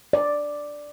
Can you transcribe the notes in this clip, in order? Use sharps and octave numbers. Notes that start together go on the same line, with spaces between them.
D5